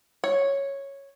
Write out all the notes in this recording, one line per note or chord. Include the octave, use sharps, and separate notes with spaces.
C#5